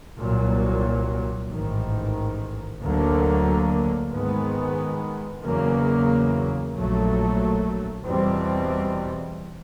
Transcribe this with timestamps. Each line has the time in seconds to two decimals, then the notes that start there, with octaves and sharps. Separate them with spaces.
0.20 C2 A#2 F#3
1.51 A1 G#2 D#3
2.82 D2 D3 F#3 A#3
4.12 G#2 D#3 G#3 B3
5.44 E2 C#3 F#3 A#3
6.74 A#1 A#2 F#3 A3
8.05 E2 B2 G3 C4